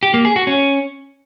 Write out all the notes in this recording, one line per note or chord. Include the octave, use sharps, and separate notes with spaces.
G4
A#3
G#4
F#4
C#4